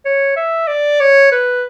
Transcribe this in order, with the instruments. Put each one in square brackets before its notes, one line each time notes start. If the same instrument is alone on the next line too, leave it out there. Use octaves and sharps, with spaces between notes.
[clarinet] C#5
E5
D5
C#5
B4